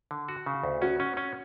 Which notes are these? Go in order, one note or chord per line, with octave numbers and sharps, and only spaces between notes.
D3
F#4
C#3
D2
C#4 F#4
C#4
C#4